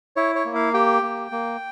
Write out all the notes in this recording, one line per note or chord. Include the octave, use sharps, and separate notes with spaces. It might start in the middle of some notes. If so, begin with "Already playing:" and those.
E4 C#5
C#5
A#3
F5
G4 G5
A#3
A#3